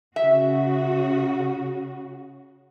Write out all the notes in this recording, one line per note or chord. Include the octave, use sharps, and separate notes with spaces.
C#3 F#4 E5